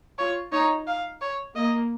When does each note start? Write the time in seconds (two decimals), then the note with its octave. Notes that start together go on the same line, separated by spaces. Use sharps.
0.18 F4 C#5
0.52 D#4 C#5
0.87 F5
1.22 C#5
1.56 A#3 D#5